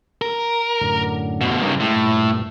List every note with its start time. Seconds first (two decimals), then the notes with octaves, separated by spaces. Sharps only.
0.22 A#4
0.81 F#2 A2 D3
1.41 D2 B2
1.62 G2 C#3 D#4 A#4
1.80 A2 G#3 G5 C6
1.95 G2 A#2